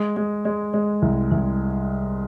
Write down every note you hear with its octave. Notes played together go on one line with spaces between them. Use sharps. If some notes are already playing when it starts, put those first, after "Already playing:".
Already playing: G#3
G#3
G#3
G#3
C2
C2